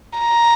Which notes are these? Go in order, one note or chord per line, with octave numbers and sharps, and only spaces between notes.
A#5